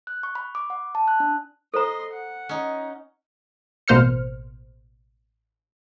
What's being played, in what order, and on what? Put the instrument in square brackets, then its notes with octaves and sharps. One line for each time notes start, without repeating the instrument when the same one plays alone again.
[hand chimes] F#6
C#6
B5
D6
F#5
A5
F#6
D4
[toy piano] A4 C5 A#5 [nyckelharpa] D#5 C6
[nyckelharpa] F#5
[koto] C#4 D#4
[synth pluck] A1 B2 A#3 C5 F6 C#7